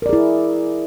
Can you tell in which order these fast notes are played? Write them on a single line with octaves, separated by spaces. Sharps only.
A#4 D5 G#4 E4